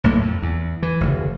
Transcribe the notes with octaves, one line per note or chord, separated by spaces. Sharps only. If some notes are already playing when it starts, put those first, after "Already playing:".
B1 A2 A#3
F2
E2
E3
F1 D2 C#3